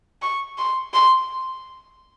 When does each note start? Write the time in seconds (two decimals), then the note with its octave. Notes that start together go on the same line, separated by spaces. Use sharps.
0.22 C#6
0.58 C6
0.94 C6